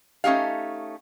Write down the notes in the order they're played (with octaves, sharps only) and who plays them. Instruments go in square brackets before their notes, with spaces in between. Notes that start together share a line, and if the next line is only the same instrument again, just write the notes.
[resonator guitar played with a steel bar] A3 C#4 D#4 G4 F5